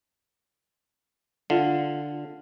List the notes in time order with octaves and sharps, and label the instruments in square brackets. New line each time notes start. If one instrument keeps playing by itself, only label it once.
[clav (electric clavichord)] D3 [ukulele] F4